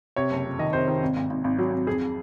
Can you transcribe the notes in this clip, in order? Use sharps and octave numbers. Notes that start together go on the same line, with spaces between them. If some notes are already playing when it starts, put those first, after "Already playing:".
C3 C#5
F#1
F2
D#3 D#5
C3 C5
D#3
G#1
G#1
G#1
G#1
F#3
G#1
F2 G#4